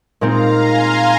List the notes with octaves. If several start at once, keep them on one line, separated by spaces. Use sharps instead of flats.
A#2 G#3 C4 D#4 F5 A#5
G#5 C6